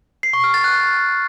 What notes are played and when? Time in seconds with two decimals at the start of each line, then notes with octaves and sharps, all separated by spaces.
0.23 C7
0.33 C#6
0.44 F6
0.54 A6
0.64 F#6